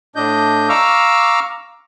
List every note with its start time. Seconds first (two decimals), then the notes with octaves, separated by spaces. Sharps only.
0.16 A2 D4 D#5 G6
0.69 F5 A#5 C#6 D6 E6 F6